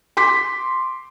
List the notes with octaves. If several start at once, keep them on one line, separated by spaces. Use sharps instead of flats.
C6 D6 B6